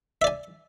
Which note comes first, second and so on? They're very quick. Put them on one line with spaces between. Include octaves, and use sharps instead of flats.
E5 D5 G#5